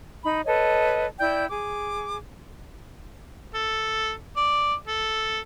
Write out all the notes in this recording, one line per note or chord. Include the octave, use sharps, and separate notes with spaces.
D#4 B5
A4 B4 C#5 D#5
E4 D5 G5 G6
G#4 D6
A4
D5
A4